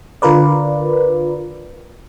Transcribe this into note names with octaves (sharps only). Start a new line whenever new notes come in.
D3 F4 A#4 B4 D5